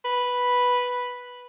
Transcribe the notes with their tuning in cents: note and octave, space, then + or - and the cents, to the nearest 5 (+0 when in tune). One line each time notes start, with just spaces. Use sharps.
B4 -5